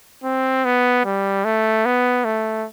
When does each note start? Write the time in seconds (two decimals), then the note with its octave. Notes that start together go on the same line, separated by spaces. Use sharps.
0.24 C4
0.65 B3
1.05 G3
1.44 A3
1.85 B3
2.24 A3